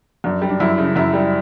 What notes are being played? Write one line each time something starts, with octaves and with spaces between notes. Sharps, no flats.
F#2 D4
G3
D4
F#2 E4
C#3
F#2 E4
G3